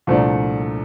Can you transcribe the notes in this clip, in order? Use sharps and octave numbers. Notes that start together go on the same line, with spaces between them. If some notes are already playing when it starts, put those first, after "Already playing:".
C2 A#2 F3 A3 D4